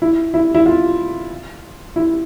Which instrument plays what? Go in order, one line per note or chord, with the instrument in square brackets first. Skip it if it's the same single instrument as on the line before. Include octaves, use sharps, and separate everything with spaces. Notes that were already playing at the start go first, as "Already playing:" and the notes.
[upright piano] E4
E4
E4
F4
E4